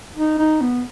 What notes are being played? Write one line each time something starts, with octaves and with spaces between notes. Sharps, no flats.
D#4
D#4
B3